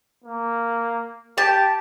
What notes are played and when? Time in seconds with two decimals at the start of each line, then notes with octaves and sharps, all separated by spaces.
0.24 A#3
1.38 G4 A5